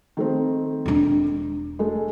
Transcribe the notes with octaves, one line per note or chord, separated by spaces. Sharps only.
D#3 A3 C4
E1 D4
G#3 A3